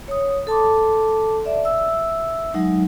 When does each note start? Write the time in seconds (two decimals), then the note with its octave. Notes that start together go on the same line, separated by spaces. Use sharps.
0.08 C#5 D#6
0.47 A4 A5 C6 D6
1.45 D5 E5
1.64 E5 E6
2.54 F#3 G#3 D#4